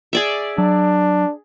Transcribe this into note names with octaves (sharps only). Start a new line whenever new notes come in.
G#4 D5 E5
F#3 D4